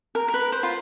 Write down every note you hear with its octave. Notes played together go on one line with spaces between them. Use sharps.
A#4
A#4
B4
C5
F4